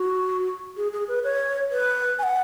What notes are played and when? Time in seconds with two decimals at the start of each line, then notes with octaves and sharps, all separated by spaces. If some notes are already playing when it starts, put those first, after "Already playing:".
Already playing: F#4
0.77 G#4
0.93 G#4
1.08 B4
1.24 C#5
1.71 B4
2.19 G#5
2.23 F#5